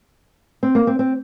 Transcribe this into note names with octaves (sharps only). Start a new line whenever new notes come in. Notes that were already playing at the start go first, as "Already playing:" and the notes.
C4
A#3
C4
C4